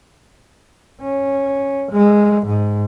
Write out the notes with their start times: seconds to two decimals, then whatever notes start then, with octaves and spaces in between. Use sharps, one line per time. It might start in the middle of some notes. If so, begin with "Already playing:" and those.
1.01 C#4
1.92 G#3
2.47 G#2